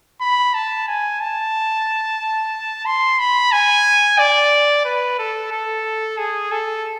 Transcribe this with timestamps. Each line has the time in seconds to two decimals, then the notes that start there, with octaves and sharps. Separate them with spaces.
0.21 B5
0.54 A5
0.87 G#5
1.20 A5
2.86 C6
3.19 B5
3.52 G#5
4.19 D5
4.85 B4
5.18 A4
5.52 A4
6.18 G#4
6.51 A4